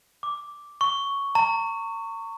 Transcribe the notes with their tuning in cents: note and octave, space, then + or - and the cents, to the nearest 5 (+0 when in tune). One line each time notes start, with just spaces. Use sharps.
D6 -5
C#6 +5
A#5 -40